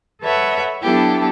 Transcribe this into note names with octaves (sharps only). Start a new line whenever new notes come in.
A4 B4 C#5 E5 F#5
F#3 B3 D4 E4 G4 A4